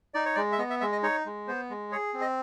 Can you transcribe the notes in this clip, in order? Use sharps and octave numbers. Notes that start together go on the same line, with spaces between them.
D#4 D5
C#5
G#3 D5
E5
B3 D#5
E5
G#3 E5
D#5
D#4 C#5
G#3
B3 C5
G#3
G#4 C#5
C4
D#5